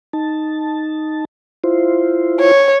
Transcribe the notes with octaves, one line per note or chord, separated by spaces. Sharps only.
D#4 A5
E4 F4 C5
C#5